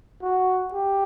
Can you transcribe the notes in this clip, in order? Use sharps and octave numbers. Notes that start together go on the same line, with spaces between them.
F#4
G4